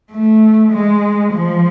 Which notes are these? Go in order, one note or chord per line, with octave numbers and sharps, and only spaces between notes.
A3
G#3
F3